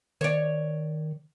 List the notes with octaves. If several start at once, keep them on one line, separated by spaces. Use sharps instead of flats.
D#3 C#5 D5